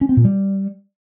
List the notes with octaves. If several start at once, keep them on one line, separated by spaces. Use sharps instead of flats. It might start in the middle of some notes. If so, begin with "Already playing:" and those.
C#4
C4
A#2
G3